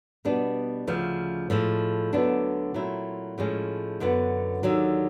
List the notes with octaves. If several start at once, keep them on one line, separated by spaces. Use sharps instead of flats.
B2 G3 B3 D4
D2 C#3 F3
A2 F3 G#3
D2 D3 F#3 B3 D4
A#2 F#3 A3 C4 E4
A2 F3 G#3 C#4
F#2 D3 F#3 B3
D#2 D3 F#3